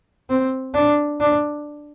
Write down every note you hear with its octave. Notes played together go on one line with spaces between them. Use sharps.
C4
D4
D4